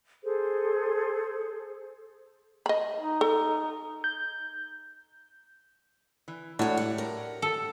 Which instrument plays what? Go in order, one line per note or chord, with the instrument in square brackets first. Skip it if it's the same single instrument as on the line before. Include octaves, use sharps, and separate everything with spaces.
[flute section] G#4 A4 C5
[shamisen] D#5 B5
[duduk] D#4
[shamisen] A4
[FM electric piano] G6
[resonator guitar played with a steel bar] E3
[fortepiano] A2 [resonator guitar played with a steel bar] D4 [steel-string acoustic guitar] F#4 C#5
[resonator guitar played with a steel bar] F#4 G4 [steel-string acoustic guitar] F#5
[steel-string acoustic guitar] A#4
[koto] A4